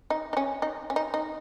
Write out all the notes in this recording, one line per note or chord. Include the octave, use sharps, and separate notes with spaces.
D#4
D#4
C#4
D#4
C#4
D#4
D#4